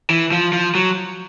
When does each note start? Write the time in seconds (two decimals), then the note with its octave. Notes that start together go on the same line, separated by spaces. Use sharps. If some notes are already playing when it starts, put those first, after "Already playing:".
0.10 E3
0.32 F3
0.53 F3
0.75 F#3